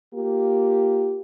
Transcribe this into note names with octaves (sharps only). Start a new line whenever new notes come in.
A#3 F4 G4